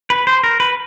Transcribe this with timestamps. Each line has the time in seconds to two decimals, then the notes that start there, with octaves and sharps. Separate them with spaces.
0.10 B4
0.27 C5
0.43 A#4
0.60 B4